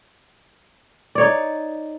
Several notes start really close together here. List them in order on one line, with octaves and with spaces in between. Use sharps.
D5 C#5 D#4